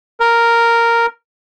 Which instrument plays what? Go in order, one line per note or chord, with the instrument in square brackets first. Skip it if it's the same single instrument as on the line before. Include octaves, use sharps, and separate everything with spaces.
[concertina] A#4